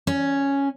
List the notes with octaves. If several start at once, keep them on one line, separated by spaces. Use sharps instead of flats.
C#4